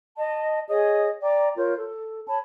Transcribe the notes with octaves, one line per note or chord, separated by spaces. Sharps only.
D#5 A5
G#4 C#5 D#5 D#6
D5 G5 A#5 D6
F4 A#4 C#5 G6
A4
C#5 A5 B5